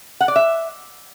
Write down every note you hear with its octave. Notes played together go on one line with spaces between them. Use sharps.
F#5
D5
E5